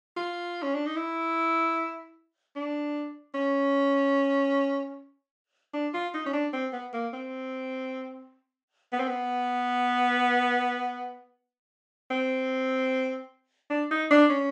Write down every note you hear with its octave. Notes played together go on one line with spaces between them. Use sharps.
F4
C#4
D4
D#4
E4
D4
C#4
D4
F4
D#4
C#4
D4
C4
B3
A#3
C4
B3
C4
B3
C4
D4
D#4
D4
C#4